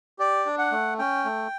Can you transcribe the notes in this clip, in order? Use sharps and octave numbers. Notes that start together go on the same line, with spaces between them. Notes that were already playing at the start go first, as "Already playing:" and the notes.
G4 D5
D4
F#5
A3
C#4 G5
A3